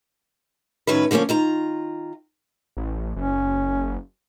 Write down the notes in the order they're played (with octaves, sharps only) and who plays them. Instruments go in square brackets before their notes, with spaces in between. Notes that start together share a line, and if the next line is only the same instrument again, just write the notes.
[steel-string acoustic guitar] A2 D#3 F#3 C#4 B4
D3 F3 A#3 C4 C#4
D#3 F4 A#5
[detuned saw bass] A1
[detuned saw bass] F#1 [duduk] C#4